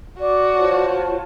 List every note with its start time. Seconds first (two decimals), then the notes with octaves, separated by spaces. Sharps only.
0.20 F#4 D5
0.57 F4 C5 C#5 A5